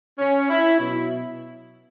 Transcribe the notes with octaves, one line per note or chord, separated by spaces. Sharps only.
C#4
E4
B2 F#3 E4